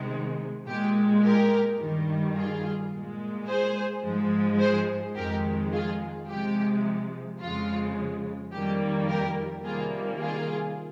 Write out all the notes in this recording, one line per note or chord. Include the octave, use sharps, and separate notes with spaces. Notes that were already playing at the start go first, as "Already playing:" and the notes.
Already playing: C3 D#3 G#3
A#2 G#3 G4
G4 A#4
G2 D#3 G3
F4 G#4
A#2 G#3
G#4 C5
G#2 F3 G#3
G#4 C5
F2 D#3 G#3 G4 A#4
F4 G#4
C3 F3 G#3 G4
F2 C#3 G#3 F4
F2 D#3 G3 A#3 G4
G4 A#4
C3 D#3 G3 A#3 F4 G#4
F4 G#4